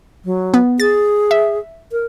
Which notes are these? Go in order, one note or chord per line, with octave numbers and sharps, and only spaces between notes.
F#3
B3
G#4 A6
E5
A#4